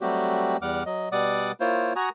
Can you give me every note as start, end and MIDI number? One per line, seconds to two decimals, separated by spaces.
0.01 0.57 54
0.01 0.57 55
0.01 0.57 57
0.01 0.57 60
0.01 0.57 66
0.01 0.57 67
0.62 0.83 40
0.62 0.83 55
0.62 0.83 78
0.62 0.83 86
0.62 0.83 89
0.86 1.09 54
0.86 1.09 75
1.12 1.52 47
1.12 1.52 55
1.12 1.52 74
1.12 1.52 78
1.12 1.52 86
1.12 1.52 87
1.60 1.93 58
1.60 1.93 64
1.60 1.93 65
1.60 1.93 72
1.60 1.93 73
1.96 2.09 66
1.96 2.09 78
1.96 2.09 80
1.96 2.09 82
1.96 2.09 85
1.96 2.09 87